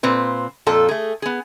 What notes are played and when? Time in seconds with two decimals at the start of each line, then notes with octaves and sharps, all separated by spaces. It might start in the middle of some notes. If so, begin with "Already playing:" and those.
0.03 A#2 C4 B4
0.66 F2 A#2 F4 A4 A5
0.89 A3 G#4
1.22 B3 G#4